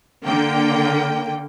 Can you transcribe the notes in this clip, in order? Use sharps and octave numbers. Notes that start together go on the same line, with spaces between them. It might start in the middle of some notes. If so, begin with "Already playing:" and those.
D3 A#3 G5